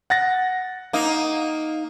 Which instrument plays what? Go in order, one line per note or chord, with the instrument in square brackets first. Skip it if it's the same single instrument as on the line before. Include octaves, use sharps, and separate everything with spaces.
[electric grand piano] F#5 A6 A#6
[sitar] A#3 D#4